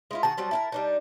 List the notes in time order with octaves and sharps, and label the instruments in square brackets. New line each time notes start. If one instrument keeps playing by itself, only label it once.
[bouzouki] G#3 E4 F4
[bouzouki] D#3 F#4 G#4 [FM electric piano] A5
[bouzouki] F#3 G3 C4
E4 G4 A#4
G3 D4 D#4